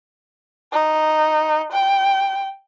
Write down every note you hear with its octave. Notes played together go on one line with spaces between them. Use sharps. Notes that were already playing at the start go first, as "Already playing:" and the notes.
D#4
G5